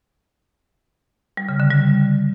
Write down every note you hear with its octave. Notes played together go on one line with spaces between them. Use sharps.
G3
C#3
D3
G3